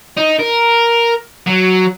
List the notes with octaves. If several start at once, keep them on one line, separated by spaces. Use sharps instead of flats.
D#4
A#4
F#3